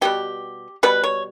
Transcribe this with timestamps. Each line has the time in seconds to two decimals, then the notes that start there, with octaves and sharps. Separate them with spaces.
0.01 B2 G3 B3 G4
0.83 B2 G3 B3 B4
1.04 C#5